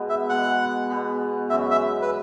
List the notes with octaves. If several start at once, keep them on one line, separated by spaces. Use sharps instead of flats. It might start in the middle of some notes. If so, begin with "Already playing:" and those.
Already playing: B2 G#3 B3
E5
B2 G#3 B3 F#5
B2 G#3 B3
F#2 E3 G#3 C#4 E5
E5
B4